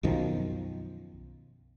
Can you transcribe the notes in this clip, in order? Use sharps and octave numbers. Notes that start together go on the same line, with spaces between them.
B1 F#2 D#3 F3